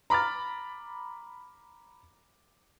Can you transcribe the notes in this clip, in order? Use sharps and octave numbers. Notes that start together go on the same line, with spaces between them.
A#5 B5 D6 F6 A6